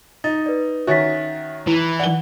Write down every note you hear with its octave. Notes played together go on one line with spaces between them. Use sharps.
D#4 A6
B4 D5
D#3 C#4 F#4 E5 A6 B6
E3 E4
D5 F#5 G7